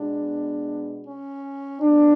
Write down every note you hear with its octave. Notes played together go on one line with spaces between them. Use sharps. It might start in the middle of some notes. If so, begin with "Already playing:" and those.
Already playing: B2 G#3 B3 D4
C#4
F#3 B3 D4